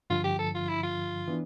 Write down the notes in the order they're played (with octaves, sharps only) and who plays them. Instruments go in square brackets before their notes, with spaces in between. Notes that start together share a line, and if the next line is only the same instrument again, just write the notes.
[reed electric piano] G2 D3 F3 [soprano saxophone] F4
[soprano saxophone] G4
A4
F4
E4
F4
[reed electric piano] E3 B3 D4